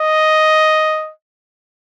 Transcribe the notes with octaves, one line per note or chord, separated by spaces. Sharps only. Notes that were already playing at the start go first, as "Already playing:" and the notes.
Already playing: D#5